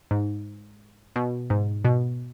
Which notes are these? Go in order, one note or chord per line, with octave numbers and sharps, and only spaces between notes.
G#2
B2
G#2
B2